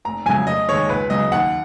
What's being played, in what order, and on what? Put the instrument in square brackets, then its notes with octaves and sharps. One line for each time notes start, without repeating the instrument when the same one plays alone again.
[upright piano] F1 A#5
F2 C#3 F#3 G#5
F1 D#5
D#2 D#3 G#3 C#5
C#2 B4
C#3 F#3 D#5
D#2 F#5